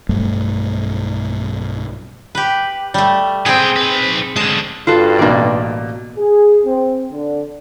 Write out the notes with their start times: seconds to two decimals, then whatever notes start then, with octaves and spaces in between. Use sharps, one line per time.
0.09 B1 G2 G3 A3
2.35 G4 B4
2.94 G3 A3
3.46 B3 C4 G#4 G5
3.76 D#4 B4
4.36 D3 G#3 A5
4.87 G2 F4 F#4 A4
5.19 A1 B2 A#3 D5
6.18 G#4
6.65 C4
7.12 D3